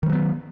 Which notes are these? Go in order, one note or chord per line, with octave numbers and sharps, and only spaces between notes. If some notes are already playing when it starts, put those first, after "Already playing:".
D#3 F#3 G3 B3